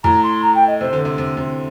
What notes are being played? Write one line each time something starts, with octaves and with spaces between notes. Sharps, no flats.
A2 A#5
C6
A#5
G5
D#5
C3 C5
D3
C3
C3
C3